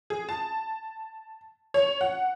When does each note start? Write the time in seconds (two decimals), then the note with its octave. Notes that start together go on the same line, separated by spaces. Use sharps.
0.10 G#4
0.29 A5
1.74 C#5
2.01 F#5